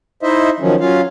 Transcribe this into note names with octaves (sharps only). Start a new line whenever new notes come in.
D#4 E4 C5 D#5 E5
D#3 F3 F#3 C#4
F#3 C#4 F4 F5